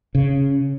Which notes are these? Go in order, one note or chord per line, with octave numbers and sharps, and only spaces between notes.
C#3